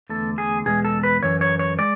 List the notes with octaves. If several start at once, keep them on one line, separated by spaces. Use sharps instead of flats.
E2 D3 A3 A4
G#4
E2 B2 G#3 G#4
A4
B4
F#2 E3 C#5
C#5
C#5
G#3 D5